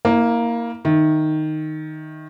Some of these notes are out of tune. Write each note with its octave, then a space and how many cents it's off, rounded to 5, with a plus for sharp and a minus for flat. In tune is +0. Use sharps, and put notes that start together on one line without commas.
A#3 +0 E4 -35
D#3 -5 E5 +0